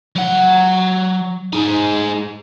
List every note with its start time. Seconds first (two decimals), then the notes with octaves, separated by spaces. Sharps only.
0.16 F#3 F#5
1.53 D#4 G#4